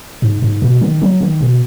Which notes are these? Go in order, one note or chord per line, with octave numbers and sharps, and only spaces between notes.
G#2
G#2
B2
D#3
F#3
D#3
B2